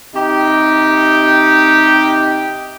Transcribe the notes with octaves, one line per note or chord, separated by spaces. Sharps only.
C3 D#4 G4